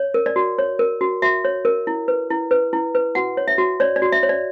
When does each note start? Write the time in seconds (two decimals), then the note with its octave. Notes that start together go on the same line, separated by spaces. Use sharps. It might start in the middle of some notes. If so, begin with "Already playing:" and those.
Already playing: C#5
0.14 A#4
0.26 D5
0.36 F#4
0.58 C#5
0.79 A#4
1.01 F#4
1.22 F#4 E5
1.45 C#5
1.65 A#4
1.87 E4
2.08 B4
2.30 E4
2.51 B4
2.73 E4
2.95 B4
3.15 F#4 F#5
3.37 C#5
3.48 E5
3.58 F#4
3.80 C#5 D5
3.96 D5
4.02 F#4
4.12 E5
4.23 C#5
4.29 D5